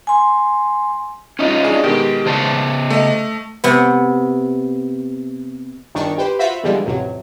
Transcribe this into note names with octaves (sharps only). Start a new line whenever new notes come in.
G#5 C6
C#4 D#4 F4
D4 G#4
B2 D#3 G#3 G4
C#3 C5 A5
A3 D#5
C3 B3
G1 D#3 D4 C#6
G4 B4 C5
F4 F#4 C5 E5 B5
D3 E3 F3 G3 G#3 B3
A1 F2 C3 F#3